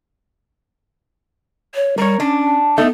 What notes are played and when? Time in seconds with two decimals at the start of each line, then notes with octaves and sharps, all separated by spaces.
1.75 C#5
1.98 G3 A#4 C#5
2.20 C#4 D4
2.78 A3 B3 D#4